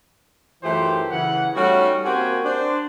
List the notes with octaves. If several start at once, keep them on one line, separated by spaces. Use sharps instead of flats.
F#2 E3 A3 F4 G4 C5
C#3 E3 F#5
G3 A3 C#4 D#4 F#4
A#3 C4 F#4 G4 C5 G#5
D4 C5